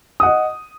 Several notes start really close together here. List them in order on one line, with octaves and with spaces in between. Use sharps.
D#6 F#5 D#5